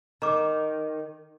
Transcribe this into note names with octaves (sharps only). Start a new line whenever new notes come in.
D#3 A#5 D6